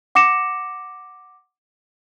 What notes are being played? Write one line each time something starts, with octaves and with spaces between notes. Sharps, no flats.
F#5 D6 A#6 C#7 E7